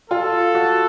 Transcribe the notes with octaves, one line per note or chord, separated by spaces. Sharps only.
F4 A4
F#4